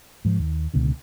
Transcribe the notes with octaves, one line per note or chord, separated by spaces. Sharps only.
G#2 F3
D#2
C#2 B2 D3